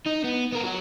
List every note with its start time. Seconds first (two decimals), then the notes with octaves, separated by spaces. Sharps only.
0.06 D#4
0.24 B3
0.52 B3 A#4
0.63 F#3 F#4